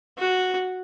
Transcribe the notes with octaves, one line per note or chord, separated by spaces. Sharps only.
F#4